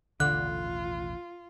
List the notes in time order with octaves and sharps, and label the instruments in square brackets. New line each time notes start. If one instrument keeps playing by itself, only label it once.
[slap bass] A1 D#2 B2 [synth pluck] D3 [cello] F4 [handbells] F#6